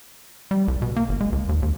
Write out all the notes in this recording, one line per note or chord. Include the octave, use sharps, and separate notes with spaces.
G3
C2
B2
A#3
G1
G#3
C#2
D#2
D#2